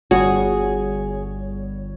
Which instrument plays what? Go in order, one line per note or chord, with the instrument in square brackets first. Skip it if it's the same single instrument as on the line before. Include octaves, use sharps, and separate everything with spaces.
[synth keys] G1 G3 C#5 [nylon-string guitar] F#4 [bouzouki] G#4